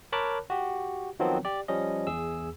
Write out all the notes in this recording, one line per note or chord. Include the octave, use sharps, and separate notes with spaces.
A#4 C#5 A5 B5 D6 F#6
F#4 G4
D#3 F3 F#3 B3 C4
G4 D5
F3 G3 C#4 D#5
E2 G#4 E6